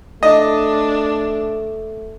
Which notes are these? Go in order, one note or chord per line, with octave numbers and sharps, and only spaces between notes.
A3 D4 D#5